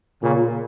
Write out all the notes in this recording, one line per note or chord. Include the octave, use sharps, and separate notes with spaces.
A#2 C#3